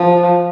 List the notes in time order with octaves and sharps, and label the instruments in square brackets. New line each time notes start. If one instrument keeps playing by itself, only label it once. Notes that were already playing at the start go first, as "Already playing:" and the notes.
Already playing: [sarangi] F3